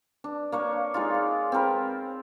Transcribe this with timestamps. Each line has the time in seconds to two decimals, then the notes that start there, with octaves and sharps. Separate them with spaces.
0.24 D4
0.52 A#3 D4 C#5
0.94 G#3 D#4 F4
1.14 D5
1.52 C4 G#4 A#4 B5